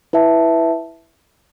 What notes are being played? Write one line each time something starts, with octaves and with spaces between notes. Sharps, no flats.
E4 B4 E5 A5